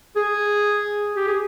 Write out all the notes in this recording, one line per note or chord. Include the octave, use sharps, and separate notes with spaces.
G#4
G4
G#4